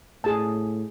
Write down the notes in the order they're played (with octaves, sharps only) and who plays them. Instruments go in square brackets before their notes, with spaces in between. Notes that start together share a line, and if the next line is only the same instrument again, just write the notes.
[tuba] A2 [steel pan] G#4 A5